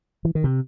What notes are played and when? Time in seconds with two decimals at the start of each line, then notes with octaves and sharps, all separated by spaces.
0.25 E3
0.35 D#3
0.44 C3